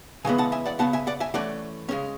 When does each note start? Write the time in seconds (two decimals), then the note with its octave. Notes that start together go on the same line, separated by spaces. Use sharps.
0.25 C#3 E3 G#3 B3 G#5
0.38 F#5 A5
0.52 E5 G#5
0.66 D5 F#5
0.79 C#3 G#3 B3 F#5 A5
0.93 E5 G#5
1.07 D5 F#5
1.20 E5 G#5
1.34 E3 A3 C#4 D5 F#5
1.89 C#3 G#3 C#4